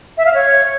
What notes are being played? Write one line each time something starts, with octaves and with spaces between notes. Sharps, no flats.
E5
F5
C#5